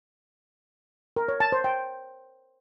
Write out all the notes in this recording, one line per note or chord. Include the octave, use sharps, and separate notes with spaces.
A#4
C#5
A5
C5
G5